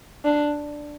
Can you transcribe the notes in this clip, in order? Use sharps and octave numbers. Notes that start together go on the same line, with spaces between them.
D4